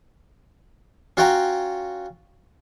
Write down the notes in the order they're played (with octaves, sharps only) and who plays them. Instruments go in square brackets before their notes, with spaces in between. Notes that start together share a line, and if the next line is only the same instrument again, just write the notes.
[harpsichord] C#4 F4 F#4 C#5 G5 A#5